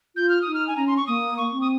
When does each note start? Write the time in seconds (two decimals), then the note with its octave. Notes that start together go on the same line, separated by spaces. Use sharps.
0.16 F4 G6
0.29 F6
0.42 D#6
0.47 D#4
0.54 F6
0.67 G#5
0.77 C#4 A#5
0.87 C6
0.97 C#6
1.07 A#3 D#6
1.37 C#6
1.52 C4
1.61 D#6